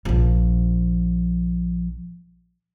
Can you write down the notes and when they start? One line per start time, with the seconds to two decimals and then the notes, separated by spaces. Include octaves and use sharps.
0.05 A#1 F3